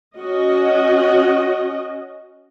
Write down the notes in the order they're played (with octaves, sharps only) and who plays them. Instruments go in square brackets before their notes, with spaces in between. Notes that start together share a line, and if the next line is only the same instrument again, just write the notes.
[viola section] C#4 F#4 D#5